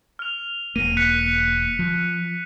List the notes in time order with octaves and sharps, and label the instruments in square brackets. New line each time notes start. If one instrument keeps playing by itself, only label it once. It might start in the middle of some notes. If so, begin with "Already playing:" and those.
[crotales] F6 F7
[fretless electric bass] E1 E2 A#3 [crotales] D#7
[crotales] F#6 B6 C#7
[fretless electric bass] F3